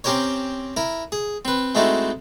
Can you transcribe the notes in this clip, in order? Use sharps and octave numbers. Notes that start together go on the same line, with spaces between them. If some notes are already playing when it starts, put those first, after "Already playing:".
C4 C#4 G4 A#4 C5 C#5
E4 A#4
G#4
C4 B4
G#3 A3 C4 D#4 E4 F#4